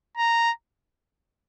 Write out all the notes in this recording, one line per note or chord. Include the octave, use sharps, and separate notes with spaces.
A#5